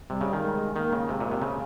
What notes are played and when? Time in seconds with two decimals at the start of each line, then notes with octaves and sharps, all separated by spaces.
0.10 C3 G3
0.21 C#3
0.33 D#3
0.43 G#3
0.76 D#3 A#3
0.93 C#3
1.09 C3 G#3
1.20 A#2
1.31 C3
1.42 C#3